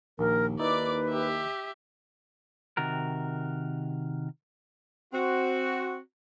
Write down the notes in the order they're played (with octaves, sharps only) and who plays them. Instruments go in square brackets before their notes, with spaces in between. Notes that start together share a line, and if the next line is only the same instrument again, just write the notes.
[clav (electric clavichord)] A#1 [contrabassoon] D#2 [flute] A#4
[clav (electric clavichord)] D#4 E4 [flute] B4 [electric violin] D5 D6
[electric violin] G4 E5
[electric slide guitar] C3 D#3 F#4 A#4
[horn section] C4 F#4